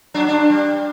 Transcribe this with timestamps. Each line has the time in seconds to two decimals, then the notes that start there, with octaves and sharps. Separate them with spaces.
0.14 F#3 D4
0.27 G2 D4
0.50 G3